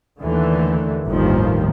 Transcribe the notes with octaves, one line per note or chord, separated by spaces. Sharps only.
D#2 D3 E3 A3
G1 D#2 A2 D#3 F3